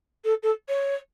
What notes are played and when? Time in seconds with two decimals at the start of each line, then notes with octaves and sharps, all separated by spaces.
0.25 A4
0.43 A4
0.69 C#5